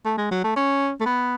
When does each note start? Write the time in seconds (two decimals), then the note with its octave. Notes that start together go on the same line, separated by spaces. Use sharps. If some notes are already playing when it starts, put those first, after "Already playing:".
0.05 A3
0.17 G#3
0.31 F#3
0.44 A3
0.56 C#4
1.00 A3
1.06 B3